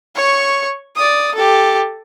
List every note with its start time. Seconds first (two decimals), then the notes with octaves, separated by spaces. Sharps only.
0.16 C#5 C#6
0.96 D5 D#6
1.35 G4 A4